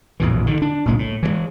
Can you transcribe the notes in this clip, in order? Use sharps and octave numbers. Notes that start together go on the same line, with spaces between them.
A#1 E2 A2 E3
D3 D#3
D4
F#1 C2 A#2 G#3
A2
E3 F3 G#3